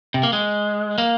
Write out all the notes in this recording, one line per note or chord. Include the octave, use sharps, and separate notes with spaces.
C3
A#3
G#3
A#3